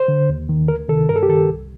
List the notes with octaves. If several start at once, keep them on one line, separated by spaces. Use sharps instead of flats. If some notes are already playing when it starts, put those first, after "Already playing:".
Already playing: C5
D3
D#2
D#3
D2 A#4
C3 D#3 A4
G2 A#4
A4
G4
D#3 A4
C2